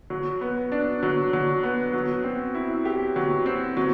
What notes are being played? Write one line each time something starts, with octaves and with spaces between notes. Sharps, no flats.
F#3
B3
D4
F#3
F#3
B3
F#3
C4
E4
G4
F#3
C4
F#3